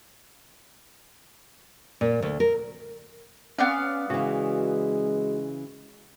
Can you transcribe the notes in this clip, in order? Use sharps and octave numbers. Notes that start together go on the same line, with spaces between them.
A#2
D2
A#4
B3 C#4 D5 F5
C#3 E3 G#3 F#4